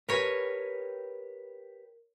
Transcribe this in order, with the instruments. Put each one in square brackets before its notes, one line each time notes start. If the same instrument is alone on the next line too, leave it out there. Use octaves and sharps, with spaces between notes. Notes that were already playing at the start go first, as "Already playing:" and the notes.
[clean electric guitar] G4 B4 [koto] A#4 C#5 G#5